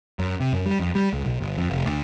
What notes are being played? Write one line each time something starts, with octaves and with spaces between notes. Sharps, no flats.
F#2
C3
F#2
G3
F2
G3
C#2
B1
G1
F2
F1
D2